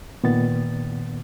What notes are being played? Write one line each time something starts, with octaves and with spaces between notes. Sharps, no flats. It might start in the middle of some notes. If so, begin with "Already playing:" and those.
A#2 D#3 B3 A6